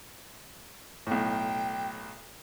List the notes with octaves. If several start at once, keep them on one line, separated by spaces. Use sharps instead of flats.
B1 A2 G5